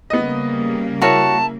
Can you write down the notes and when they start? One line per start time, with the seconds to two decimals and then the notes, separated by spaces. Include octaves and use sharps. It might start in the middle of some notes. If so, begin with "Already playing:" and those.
0.10 C#3 G3 A#3 B3 D#5
1.02 E4 F#4 A#4 C#5 A5